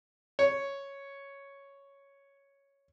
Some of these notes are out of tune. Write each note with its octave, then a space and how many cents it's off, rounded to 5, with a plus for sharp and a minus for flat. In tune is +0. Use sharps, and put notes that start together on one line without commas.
C#5 +0